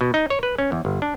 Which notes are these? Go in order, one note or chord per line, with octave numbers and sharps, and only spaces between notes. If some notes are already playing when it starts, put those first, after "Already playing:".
B2
D#4
C#5
B4
C#4
E2
G1
D4